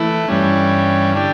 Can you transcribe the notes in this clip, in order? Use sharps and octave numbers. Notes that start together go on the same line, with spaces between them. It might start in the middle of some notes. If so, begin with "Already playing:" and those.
Already playing: E3 A3 E4
G2 E3 G3 C#4
D3 G3 D4 G4